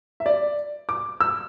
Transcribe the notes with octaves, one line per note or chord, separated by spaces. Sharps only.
E5
D5
D6
E6